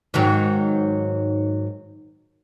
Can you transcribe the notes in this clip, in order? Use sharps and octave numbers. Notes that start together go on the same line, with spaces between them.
G#2 D#3 F#3